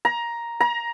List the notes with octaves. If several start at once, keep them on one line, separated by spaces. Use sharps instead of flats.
A#5
A#5